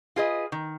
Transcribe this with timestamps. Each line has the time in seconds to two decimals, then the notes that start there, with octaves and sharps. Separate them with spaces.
0.16 F4 G#4 B4 D#5
0.52 D#3